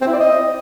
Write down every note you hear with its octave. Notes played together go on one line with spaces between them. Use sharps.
C4
E4
D5
D#5